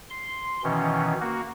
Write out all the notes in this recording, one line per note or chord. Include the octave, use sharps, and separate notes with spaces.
C6
B2 D#3 E3 C#4
A#3 F#4